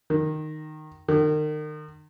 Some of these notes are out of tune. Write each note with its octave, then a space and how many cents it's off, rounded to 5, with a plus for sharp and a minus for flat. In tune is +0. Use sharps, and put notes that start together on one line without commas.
D#3 -10
D#3 -35